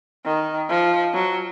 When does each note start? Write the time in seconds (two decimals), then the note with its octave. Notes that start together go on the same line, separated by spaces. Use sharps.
0.25 D#3
0.69 F3
1.14 F#3